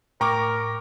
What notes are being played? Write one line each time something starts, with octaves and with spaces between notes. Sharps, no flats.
A2 A#4 G5 A#5 C#6 D6